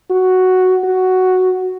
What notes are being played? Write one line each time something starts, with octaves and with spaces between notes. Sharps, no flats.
F#4
F#4